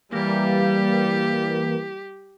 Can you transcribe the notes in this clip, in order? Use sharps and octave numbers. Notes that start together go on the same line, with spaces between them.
E3 G3 A#3 G4